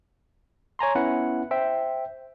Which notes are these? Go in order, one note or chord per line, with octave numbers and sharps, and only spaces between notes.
C#5 G#5 A#5 C6
B3 C#4 E4 B4 F#5
C5 E5 G5